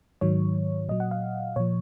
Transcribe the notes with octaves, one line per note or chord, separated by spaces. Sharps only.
G#2 D#3 F#3 C#5
A#2 F#3 D#5
F#5
F5
A#2 F3 C#5